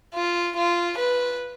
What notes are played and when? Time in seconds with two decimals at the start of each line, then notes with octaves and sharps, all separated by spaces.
0.15 F4
0.57 F4
0.98 B4